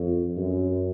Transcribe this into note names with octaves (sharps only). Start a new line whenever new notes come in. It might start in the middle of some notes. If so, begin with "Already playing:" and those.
Already playing: F2
F#2